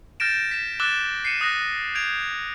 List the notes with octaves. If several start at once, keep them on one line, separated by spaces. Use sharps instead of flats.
F6 G6 A6 A#6 D7 E7
B6 E7
D6 E6 F#6 A6 E7 G7
C7 C#7 D#7 E7
D#6 F#6 A#6
G6 G#6 D7 F7